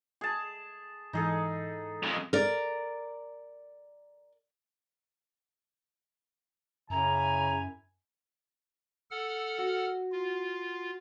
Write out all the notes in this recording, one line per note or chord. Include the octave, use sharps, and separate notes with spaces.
G#4 A5
G#2 E3 D#4 G#4 A4
F2 G#3
A#4 D5
F#2 C#3 E4 G#5 A#5
A4 F#5 F6
F#4
F4